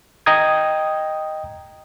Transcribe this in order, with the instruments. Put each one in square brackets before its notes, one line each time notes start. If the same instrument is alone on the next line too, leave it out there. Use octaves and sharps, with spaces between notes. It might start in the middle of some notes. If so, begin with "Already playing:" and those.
[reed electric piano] D#5 G5 A#5 D#6 G#6